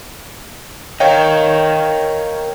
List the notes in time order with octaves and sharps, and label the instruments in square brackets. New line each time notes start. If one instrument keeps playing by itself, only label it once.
[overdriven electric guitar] A#4 D#5 [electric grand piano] C#5 F5 G5